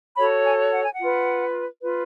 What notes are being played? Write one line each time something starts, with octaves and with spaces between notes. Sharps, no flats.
F#4 A4 C#5 B5
G#5
F#5
G#5
F#5
F4 B4
F4 B4